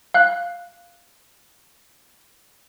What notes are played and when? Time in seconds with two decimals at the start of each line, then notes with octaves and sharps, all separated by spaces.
0.14 F5 F#6